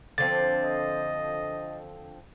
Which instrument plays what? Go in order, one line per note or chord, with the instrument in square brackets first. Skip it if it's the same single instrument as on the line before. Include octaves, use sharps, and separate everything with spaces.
[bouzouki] D3 F3 C4 [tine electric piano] A6
[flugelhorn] D#5